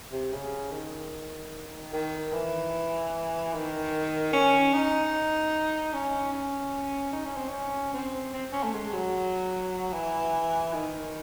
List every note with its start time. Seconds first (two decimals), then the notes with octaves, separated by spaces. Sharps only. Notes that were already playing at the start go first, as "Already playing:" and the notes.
0.12 C3
0.33 C#3
0.72 D#3
1.93 D#3
2.33 E3
3.53 D#3
4.33 C#4
4.73 D#4
5.93 C#4
6.32 C#4
7.12 D#4
7.25 C#4
7.36 C4
7.49 C#4
7.94 C4
8.34 C4
8.53 C#4
8.63 A3
8.73 G#3
8.93 F#3
9.93 E3
10.74 D#3